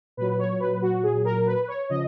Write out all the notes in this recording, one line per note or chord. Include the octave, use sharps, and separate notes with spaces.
A#2 F#3 B4
C#5
B4
F#4
G#4
A#4
B4
C#5
C#3 F3 D#5